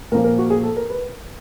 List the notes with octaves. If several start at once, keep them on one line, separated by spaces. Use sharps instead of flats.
A#2 F3 A#3 A#4
A#4
F#4
G#4
A4
A#4
B4